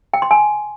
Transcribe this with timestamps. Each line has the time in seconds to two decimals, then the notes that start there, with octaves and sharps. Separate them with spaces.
0.14 G5
0.22 C6
0.31 G#5